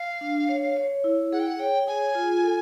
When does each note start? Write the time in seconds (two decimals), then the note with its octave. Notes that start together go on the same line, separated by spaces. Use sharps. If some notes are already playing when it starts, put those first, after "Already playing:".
Already playing: F5
0.21 D4
0.49 C#5
0.77 C#5
1.04 E4
1.32 G#4 F#5
1.39 G5
1.47 F#5
1.59 C#5 G5
1.87 G#4 G#5
2.15 F4
2.43 A4